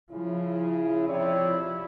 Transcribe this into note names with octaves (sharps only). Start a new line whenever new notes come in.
C#3 F3 E4
C3 F3 E4 C#5 D5